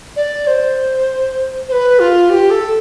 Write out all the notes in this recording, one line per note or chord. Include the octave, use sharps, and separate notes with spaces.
D5
C5
C5
B4
F4
G4
A4